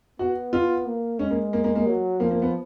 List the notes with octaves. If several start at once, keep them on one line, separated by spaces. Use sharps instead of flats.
B3 F#4
F4
A#3
G#3 C#4
A#3
A#3
A#3
A#3
F#3
F3 A#3
A#3
B3